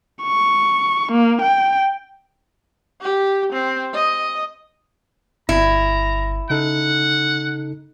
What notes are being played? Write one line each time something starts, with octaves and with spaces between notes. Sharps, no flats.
C#6
A#3
G5
G4
C4
D#5
G1 E4 A#5
C#3 D#4 A4 F#5